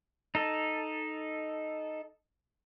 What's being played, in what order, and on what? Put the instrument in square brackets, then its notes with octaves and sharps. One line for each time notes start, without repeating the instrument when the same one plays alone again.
[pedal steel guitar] D#4 A4